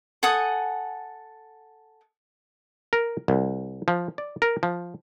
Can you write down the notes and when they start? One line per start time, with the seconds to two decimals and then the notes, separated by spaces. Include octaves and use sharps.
0.23 A4 F#5 G#5 D#6
2.93 A#4
3.28 C2
3.88 F3
4.18 D5
4.42 A#4
4.63 F3